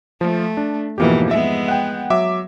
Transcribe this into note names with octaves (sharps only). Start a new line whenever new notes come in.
F3 A3
D4
F2 G#2 B2 E3 A#3 G4
G#3 B3 E5
F#5 G5
F#3 E5 D6